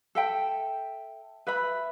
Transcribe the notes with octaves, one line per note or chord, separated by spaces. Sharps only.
A4 E5 G5
B4 E5 B5